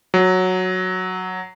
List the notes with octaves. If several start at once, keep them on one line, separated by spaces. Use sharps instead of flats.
F#3